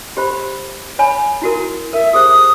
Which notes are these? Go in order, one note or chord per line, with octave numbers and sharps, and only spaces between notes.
G4 C5 B5
C#5 G#5 B5
E4 F#4 A#4
A#4 E5
G4 G#4 C5 D#6